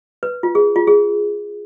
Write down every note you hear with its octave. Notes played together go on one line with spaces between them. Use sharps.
B4
F4
G#4
F4
G#4